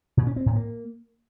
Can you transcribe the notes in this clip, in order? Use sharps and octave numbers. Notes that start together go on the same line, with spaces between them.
A#2
C#4
C4
A2
A#3